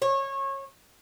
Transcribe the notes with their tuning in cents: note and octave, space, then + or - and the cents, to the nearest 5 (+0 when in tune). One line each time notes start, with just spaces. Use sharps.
C#5 -25